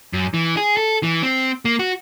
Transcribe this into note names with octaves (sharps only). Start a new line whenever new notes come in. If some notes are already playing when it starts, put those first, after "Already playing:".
F#2
E3
G#4
A4
E3
C4
A#3
F#4